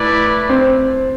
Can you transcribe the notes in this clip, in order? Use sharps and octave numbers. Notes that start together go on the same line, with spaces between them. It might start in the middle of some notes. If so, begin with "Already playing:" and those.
Already playing: A3 E4 B4 D5
C4